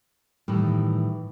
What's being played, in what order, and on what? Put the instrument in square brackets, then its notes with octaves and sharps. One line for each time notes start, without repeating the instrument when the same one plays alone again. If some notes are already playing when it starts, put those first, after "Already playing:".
[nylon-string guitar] A2 D#3 E3 G3